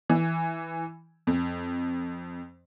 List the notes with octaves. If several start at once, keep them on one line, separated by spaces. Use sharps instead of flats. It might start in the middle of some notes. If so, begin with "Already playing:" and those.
E3
F2